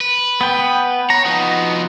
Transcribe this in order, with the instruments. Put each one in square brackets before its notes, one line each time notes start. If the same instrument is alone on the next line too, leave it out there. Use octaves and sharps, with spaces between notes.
[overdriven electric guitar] B4
[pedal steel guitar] B3 G5
[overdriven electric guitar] C#5 [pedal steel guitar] A#5
[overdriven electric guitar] F3 F#4 [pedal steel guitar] B3 D#4